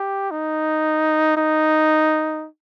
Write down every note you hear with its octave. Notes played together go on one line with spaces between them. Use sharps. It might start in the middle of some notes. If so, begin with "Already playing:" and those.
Already playing: G4
D#4
D#4